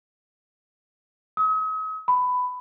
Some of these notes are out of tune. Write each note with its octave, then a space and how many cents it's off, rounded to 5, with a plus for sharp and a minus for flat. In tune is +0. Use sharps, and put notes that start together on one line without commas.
D#6 +45
B5 +15